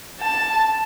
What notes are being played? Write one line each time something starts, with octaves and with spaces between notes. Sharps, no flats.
A5